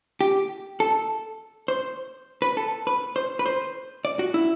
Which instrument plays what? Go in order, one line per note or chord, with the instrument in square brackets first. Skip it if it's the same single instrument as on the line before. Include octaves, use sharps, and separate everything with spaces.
[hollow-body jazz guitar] G4
A4
C5
B4
A4
B4
C5
B4
C5
D5
F#4
E4